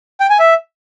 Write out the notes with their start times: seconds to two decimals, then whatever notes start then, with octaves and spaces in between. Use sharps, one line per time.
0.20 G5
0.30 G#5
0.39 E5